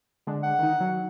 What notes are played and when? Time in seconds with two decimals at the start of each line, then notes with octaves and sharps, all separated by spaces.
0.27 D3 G#3 D4
0.43 F#5
0.59 D#3 D#4
0.80 F#3